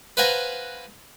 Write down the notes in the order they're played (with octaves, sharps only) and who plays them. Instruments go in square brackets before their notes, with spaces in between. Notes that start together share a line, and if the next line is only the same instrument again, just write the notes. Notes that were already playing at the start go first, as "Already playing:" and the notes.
[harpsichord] B4 C5 F5 F#5 G#5 A#5